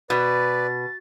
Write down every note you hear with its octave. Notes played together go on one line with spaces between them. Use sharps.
B2 B4 D5 A6